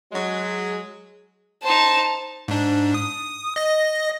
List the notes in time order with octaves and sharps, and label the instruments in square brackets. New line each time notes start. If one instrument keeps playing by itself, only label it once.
[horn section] F#3 G#3
[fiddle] D#4 C5 [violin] A5
[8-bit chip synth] G#2 D4
D#6
D#5 A#6